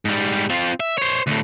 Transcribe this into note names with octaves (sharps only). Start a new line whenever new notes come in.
G#2 G3
C4 F4
E5
C5 C#5
D2 A2